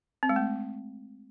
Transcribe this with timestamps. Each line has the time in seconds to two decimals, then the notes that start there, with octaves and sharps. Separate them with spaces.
0.23 C4
0.29 G#3
0.36 A3